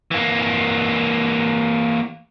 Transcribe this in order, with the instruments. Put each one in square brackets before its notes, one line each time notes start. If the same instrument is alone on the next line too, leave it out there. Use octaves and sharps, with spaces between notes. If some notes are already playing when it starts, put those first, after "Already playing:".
[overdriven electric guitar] E3 A#3